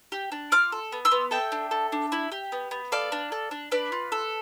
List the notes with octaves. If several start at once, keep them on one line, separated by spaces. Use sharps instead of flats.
G4
D4
F4 D6 F6
A4
B3
C6 E6
B3
A4 E5 G5
D4
A4
D4
E4
G4
B3
B3
A4 D5 F5
D4
A4
D4
D4 B4 D5
F4
A4